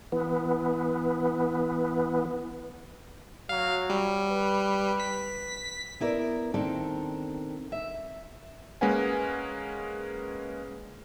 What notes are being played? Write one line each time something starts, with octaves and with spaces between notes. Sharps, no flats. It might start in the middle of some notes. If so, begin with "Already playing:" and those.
E3 B3
F#3 F5
G3
B4
B6
B3 E4 A#4 D5
D#3 C4 D4 A4 A#4
E5
G#3 A#3 C#4 B4 F#5 G#5